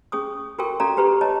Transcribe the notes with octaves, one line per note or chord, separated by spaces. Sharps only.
C#4 G#4 C#6 D#6
F4 F#4 A4 A#4 G5 C#6
C#4 F#4 A4 D5 F5 A#5
F4 G4 B4 A#5 C#6
C#5 D#5 A5 A#5